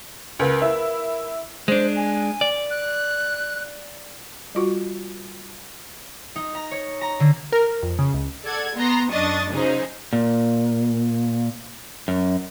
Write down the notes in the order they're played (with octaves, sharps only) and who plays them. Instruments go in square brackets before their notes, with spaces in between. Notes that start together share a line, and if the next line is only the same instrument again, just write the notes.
[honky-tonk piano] C#2 [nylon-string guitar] A#4 B4 F5
[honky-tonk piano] E4
[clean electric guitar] G#3 D4 [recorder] C5
[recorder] G#5
[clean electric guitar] D5
[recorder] F#6
[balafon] G3 F4 F#4
[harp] D#4
A#5
C#5
A#5
D3
[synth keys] A#4
A#4
F2
C#3
C#2
[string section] A4 D5 F#5 G#6
B3 A#5 C6 A#6 C7
F#2 D4 D#5 C#6 D#6 A6
C#3 F#3 D#4 G#4 C5
[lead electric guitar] A#2
F#2